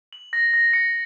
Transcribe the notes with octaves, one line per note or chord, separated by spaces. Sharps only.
F#7
A#6
A#6
C#7